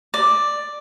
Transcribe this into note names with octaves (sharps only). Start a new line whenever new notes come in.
D5